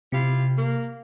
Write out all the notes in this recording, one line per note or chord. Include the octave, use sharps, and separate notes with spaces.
C3 E4 F4 G4
A#3